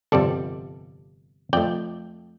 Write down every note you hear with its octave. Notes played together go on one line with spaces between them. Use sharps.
G1 F2 C3 G3 A4 D5
F2 F3 A3 D5 G5